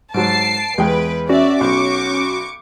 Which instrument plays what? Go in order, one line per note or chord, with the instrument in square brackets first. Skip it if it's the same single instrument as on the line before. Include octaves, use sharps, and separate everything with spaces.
[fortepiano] G#2 F#3 [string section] A5 C7 [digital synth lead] D7
[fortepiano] E2 G#3 G5 [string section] B4
[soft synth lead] C#4 [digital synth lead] F#4 [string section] D5 E5
[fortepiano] B1 [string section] C#6 D6